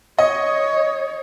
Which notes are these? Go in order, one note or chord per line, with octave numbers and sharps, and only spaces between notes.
C#5 D#5